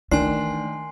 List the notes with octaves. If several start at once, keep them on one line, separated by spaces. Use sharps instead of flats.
D#3 E3 A3 D4 G#5 C6 C7